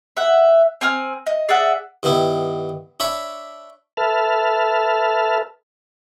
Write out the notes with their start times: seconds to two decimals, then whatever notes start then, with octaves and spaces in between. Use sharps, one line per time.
0.17 E5 F#5
0.81 C4 G#5 D#6 F6
1.26 D#5
1.49 G#4 D5 E5 F#5
2.03 G2 D#3 B3 E4
3.00 D4 C#5 E5 B5
3.97 A4 B4 E5 A5 F6